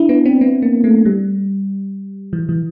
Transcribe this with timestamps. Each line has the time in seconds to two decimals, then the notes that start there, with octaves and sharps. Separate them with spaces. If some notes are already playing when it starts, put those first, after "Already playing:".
Already playing: D4 E4
0.09 B3
0.26 C4
0.41 B3
0.62 A#3
0.84 A3
1.05 G3
2.33 E3
2.49 E3